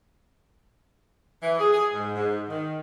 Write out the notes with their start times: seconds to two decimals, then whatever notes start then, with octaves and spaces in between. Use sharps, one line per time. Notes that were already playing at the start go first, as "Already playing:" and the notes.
1.42 E3
1.59 G#4
1.73 G#4
1.94 G#2
2.16 G#2
2.50 D#3